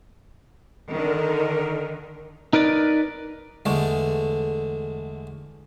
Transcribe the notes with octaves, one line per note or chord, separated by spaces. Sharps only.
D3 D#3 A#4
D#4 A#4 B4 D5
E2 D3 G#3 A3